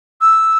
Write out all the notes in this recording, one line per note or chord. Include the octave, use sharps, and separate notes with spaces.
E6